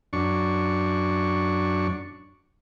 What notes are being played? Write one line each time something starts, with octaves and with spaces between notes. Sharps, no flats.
F#2 D4 C#6